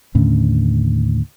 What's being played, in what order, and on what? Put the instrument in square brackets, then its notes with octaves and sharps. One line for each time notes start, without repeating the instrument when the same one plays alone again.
[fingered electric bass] D#2 A2 D3 C#4